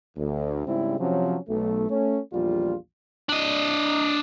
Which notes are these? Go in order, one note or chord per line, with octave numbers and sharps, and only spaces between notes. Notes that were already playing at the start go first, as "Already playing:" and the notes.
D2
G#2 C#3 G3 C4 E4
C3 F3 F#3 C#4
B1 A3
A3 C#4
A#1 E2 G3 F4
D4 D#5